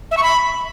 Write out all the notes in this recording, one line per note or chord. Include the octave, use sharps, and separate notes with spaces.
E5
C#6
B5